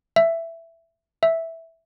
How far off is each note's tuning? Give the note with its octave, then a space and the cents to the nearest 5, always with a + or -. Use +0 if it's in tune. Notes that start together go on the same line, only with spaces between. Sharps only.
E5 +10
E5 -5